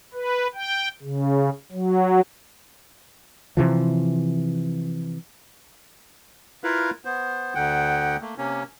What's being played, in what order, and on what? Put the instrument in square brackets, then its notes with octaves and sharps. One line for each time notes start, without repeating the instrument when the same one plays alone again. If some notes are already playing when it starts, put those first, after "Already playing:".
[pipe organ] B4
G5
C#3
F#3
[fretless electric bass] C3 E3 F3
[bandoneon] E4 F4 A#4 B4 F5
B3 C5
D2 D3 F#5 G5
A3 A#3
C3 A#3 C#4